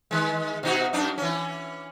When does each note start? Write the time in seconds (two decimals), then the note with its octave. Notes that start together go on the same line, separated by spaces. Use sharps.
0.11 D#3 G#3
0.63 B2 D#4 F#4
0.93 F#2 D4 D#4
1.18 E3 C#4